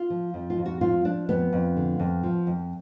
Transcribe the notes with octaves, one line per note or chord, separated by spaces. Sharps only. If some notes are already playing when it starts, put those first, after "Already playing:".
Already playing: F4
F3
F2
F4
F2
F#4
F3 F4
F3 D4
F2 B3
F2
D3
F2
F3
F2